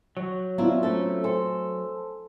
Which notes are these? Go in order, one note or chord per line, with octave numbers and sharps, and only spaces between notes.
F#3 C#5
B3 C4 D4 E4 F4 A#5
A3 C#4 F4 A4 C5 C#5
A4 C5 G#5 C6